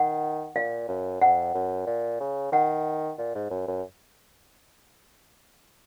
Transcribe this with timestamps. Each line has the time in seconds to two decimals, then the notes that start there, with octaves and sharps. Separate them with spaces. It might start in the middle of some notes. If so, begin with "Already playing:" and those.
Already playing: D#3 F#5
0.56 A#2 F5
0.88 F#2
1.21 F2 F#5
1.54 F#2
1.86 A#2
2.20 C#3
2.52 D#3 F#5
3.18 A#2
3.35 G#2
3.50 F#2
3.67 F#2